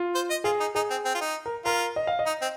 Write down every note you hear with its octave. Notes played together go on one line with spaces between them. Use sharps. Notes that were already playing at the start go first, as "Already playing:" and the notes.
Already playing: F4
C5
D#5
F4 G#4
D#4
D#4 G#4
C4
C4
F4
D#4
A#4
F4 A#4
D#5
F5
D#5
D#4
C4